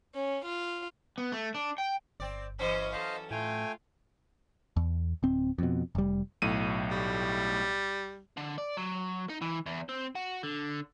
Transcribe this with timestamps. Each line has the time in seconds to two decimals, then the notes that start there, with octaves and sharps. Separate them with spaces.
0.14 C#4
0.45 F4
1.18 B3
1.32 A3
1.55 D4
1.78 G5
2.20 G1 C4 D5
2.59 E3 F#3 C#4 C5 D#5
2.93 A4 C5 D#5 F5
3.31 A2 A3 F4 G5 G#5
4.77 E2
5.23 D1 C4
5.58 F2 B2
5.95 F1 G3
6.42 B1 A2 D#7
6.91 G3
8.37 D3
8.58 D5
8.77 F#3
9.29 D#4
9.42 E3
9.66 E2
9.89 C4
10.15 F#4
10.43 D3